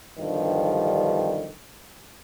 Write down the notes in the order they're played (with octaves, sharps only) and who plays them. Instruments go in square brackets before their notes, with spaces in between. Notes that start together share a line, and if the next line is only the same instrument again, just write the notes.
[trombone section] B1 G2 D3 D#3 F3 G3